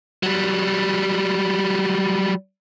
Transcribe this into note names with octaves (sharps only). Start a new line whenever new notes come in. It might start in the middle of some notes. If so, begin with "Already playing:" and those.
F#3 G3